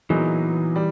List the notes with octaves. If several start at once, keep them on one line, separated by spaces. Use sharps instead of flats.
A#2 E3 F#3 B3 D#4 G#4
G3